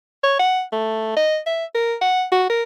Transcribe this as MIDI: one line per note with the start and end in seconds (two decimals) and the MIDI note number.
0.24 0.38 73
0.39 0.62 78
0.73 1.15 57
1.17 1.38 75
1.46 1.65 76
1.75 1.95 70
2.01 2.24 78
2.32 2.48 66
2.50 2.63 70